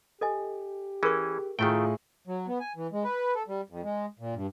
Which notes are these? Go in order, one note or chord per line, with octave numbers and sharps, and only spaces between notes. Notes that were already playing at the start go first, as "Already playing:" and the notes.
G4 A4 D#5 G#5
E3 C#4 G#4 A#4 C#6
A2 D#3 A3 E4 F4 G#4 G5
F#3
B3
G#5
E3
G#3
B4
A4
G3
F2
G#3
A#2
G2